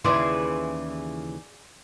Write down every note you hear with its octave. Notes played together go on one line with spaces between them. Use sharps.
D#2 C#3 E3 G#4 D5 C6